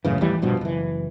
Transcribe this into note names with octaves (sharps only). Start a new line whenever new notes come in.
F#2 A2 C#3 E3
A1 D#2 E3 G3
A#1 G2 B2 F3
F#1 E3